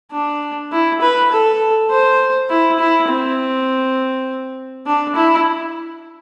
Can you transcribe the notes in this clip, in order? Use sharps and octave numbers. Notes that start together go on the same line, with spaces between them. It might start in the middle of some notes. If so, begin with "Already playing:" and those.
D4
E4
B4
A4
C5
E4
E4
C4
D4
E4